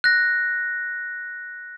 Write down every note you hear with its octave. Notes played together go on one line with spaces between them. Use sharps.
F#6 A#6